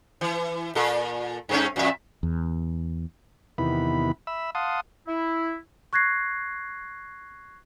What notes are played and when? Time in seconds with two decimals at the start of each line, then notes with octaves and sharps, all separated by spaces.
0.21 E3
0.75 A#2 A4
1.49 G2 A3 C#4
1.76 F2 A#2 E5
2.23 E2
3.58 E2 C3 D#3 B3 E4 B5
4.27 E5 B5 E6
4.55 F5 F#5 A5 C6 D#6
5.07 E4
5.93 C#6 F#6 G#6 A#6 C7